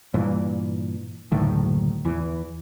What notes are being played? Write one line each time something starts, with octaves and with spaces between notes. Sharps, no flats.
G2 A#2 E3
F#1 D2 A2 D#3
E2 E3